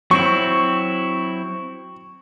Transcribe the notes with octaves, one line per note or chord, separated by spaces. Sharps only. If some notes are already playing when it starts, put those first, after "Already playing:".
F#3 C4 E4 C#6